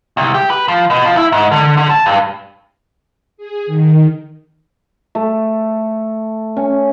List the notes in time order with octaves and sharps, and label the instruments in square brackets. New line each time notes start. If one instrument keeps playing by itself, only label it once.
[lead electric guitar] C2
G4
B4
F3
B2
F3
E4
G#2
D3
D3
A5
G2
[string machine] G#4
D#3
[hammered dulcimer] A3
C#4